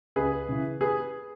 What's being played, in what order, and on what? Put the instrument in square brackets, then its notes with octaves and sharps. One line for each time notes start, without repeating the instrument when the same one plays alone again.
[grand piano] C#2 G#4 B4
C#3 E3
G#4 B4